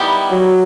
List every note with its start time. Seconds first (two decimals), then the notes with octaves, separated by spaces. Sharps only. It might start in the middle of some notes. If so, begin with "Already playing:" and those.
Already playing: D#3 G3 B3 E4 G4
0.30 F#3